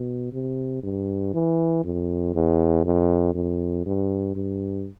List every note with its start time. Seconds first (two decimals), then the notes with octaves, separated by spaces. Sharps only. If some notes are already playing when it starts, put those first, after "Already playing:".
Already playing: B2
0.33 C3
0.83 G2
1.34 E3
1.84 F2
2.35 E2
2.85 F2
3.35 F2
3.86 G2
4.36 G2